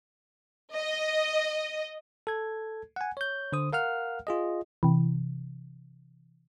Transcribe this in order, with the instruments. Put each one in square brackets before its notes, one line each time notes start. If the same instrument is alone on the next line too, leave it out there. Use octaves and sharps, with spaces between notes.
[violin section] D#5
[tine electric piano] A4 G#6
F#5 G#5
C#5 G6
D3 C5 D#6
A#4 F5 F#5 F6
F4 G#4 D#5
[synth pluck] C3 E3